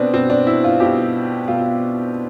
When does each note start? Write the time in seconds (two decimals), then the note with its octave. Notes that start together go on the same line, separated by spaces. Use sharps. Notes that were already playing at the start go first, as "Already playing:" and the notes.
Already playing: B2 B3 C4 D4
0.13 B2 C4
0.30 D4
0.47 E4
0.64 F4
0.80 B2 G4
1.48 B2 F4